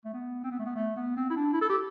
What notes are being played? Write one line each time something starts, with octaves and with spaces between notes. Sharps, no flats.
A3
B3
C4
B3
A3
B3
A3
B3
C4
E4
D4
E4
A4
G4